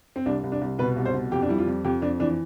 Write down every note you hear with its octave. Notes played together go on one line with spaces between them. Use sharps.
C4
C2 D4
C2
D4
C2
B2 B4
C2
C5
B2
F2 G4
D4
G3 E4
F4
F2
F2 G4
F2 D4
E3 D4